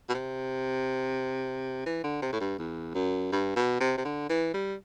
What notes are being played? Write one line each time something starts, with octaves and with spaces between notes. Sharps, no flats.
B2
C3
E3
D3
C3
A2
G2
E2
F#2
G2
B2
C3
C3
D3
E3
G3